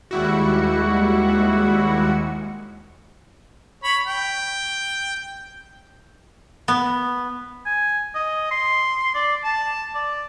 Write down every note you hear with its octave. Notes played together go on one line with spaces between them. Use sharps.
D#2 G3 G#3 E4 F#4 C#7
C#5 B5
G5
B3
G#5
D#5
C6
D5
A5
D5